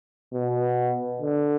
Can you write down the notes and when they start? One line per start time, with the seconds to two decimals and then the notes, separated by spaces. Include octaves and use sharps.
0.33 B2
1.22 D3